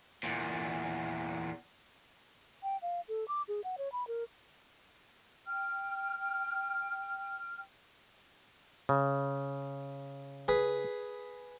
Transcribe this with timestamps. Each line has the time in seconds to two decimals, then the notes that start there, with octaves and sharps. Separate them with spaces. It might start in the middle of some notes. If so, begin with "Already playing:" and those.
0.23 E2 A#2
2.63 G5
2.82 F5
3.09 A4
3.28 D6
3.48 G#4
3.64 F#5
3.78 C#5
3.92 B5
4.08 A#4
5.47 G5 F6
8.89 C#3
10.48 G#4 B4